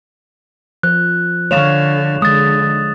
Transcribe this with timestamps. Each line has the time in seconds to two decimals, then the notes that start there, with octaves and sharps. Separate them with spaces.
0.83 F3 F#6
1.51 D3 C#5 F5 E7 F7
2.22 D3 G#3 D#6 A6